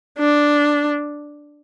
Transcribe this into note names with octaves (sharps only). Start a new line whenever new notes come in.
D4